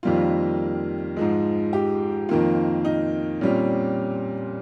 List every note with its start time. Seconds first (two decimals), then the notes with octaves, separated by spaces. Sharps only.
0.03 F2 D#3 G3 A#3 F4
1.17 G#2 F3 G#3
1.73 G4
2.29 F2 D#3 A#3 F4
2.85 D#4
3.41 A#2 G3 C4 C#4